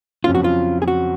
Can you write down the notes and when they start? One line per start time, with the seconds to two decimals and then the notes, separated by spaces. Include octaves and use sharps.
0.24 F2 C#3 F#3 F4
0.35 F#4
0.44 F4
0.82 G#4
0.88 F#4